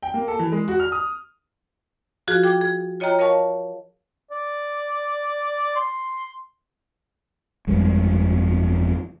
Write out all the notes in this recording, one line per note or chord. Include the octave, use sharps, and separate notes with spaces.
G5
A#3
A4
E3
G#3
F#4
F6
D#6
F3 F4 F#4 G#4
G#4 G5 D6
G#4
F4 C#5 D#5 G5 A#5 F6
A#4 C#5 D#5 F5 A5 C#6
D5
C6
G1 F2 G3 G#3